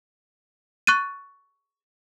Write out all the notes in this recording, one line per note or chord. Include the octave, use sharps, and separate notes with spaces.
C#6 F#6 A6 D#7